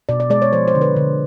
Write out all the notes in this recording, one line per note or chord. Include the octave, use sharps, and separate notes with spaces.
B2 D5
D5
G#3 D5
C#5
F3 C5
C5
D3
B4
D3